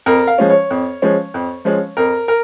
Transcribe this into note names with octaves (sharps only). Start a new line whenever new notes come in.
F2 A#4
F5
F3 G#3 C#4
C#5
F2
F3 G#3 C#4
F2
F3 G#3 C#4
F2 A#4
A#4